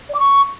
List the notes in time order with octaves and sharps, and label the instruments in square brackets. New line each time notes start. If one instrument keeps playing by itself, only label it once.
[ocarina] D5
D6
C#6